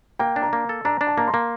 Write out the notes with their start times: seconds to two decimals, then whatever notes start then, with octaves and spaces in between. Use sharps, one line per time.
0.19 A#3 G5
0.36 D4
0.42 A#5
0.53 A#3
0.69 A4
0.85 D4 A#5
1.01 D4
1.07 A5
1.17 A#3 A#5
1.28 C6
1.34 A#3